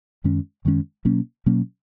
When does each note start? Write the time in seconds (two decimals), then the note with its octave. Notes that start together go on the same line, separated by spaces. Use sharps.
0.24 F#2 D#3 G#3 C#4
0.65 F#2 D#3 G#3 C#4
1.05 B2 F#3 A#3 C#4
1.46 B2 F#3 A#3 C#4